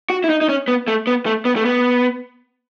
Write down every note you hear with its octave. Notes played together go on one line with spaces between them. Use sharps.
F#4
E4
D#4
D#4
C#4
B3
A3
B3
A3
B3
A3
B3